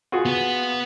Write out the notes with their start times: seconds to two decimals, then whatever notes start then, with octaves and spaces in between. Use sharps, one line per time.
0.12 F4 F#4 G#4
0.25 B3 B4